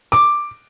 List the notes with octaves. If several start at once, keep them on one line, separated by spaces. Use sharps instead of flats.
D6